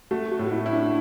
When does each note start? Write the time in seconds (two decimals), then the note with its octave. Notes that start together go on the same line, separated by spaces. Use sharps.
0.11 A3 F#4
0.31 F#4
0.39 A2
0.46 F#4
0.51 E4
0.66 E4
0.73 D4